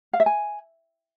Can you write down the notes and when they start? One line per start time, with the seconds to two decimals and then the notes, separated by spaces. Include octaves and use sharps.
0.13 F5
0.20 E5
0.26 G#5